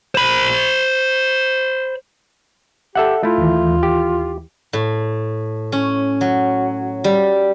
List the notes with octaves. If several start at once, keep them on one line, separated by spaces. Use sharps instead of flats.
C5 B5
G4 A4 E5 F#5
A3 E4 F4
D#2 E3
G4
A2
C#4
F#3
G3